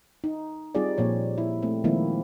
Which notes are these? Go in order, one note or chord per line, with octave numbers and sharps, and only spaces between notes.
D#4
G3 C4 D#4 F4 G#4 D5
A#2 F3 C#5
E4
A3 C4
D#3 F3 G#3 A#3 C4 E4